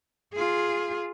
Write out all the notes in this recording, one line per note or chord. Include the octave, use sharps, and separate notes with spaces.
F4 G#4